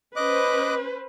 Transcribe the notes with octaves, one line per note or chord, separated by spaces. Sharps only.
C#4 B4 C5 D#5 D6 F#6